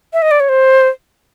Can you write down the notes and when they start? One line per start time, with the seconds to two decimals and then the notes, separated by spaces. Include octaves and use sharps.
0.13 E5
0.22 D#5
0.31 D5
0.40 C#5
0.49 C5